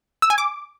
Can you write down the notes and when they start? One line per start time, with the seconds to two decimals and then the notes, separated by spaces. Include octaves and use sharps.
0.22 E6
0.30 G#5
0.38 D6